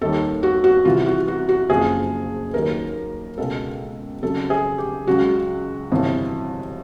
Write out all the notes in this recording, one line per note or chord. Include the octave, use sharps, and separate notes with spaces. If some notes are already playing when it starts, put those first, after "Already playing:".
D#2 D#3 G3 A4
F#4
F#4
C2 C3 E3 F4
F#4
F#4
F#4
F#1 F2 C#3 F3 G#4
D#2 D#3 F#3 A#4
C#2 B2 G#3 A4
F2 C#3 F#3 A4
G#4
G4
C#2 C#3 F#3 F#4
G1 F2 C3 E3